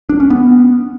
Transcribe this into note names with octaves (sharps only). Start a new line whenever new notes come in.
D4
C#4
B3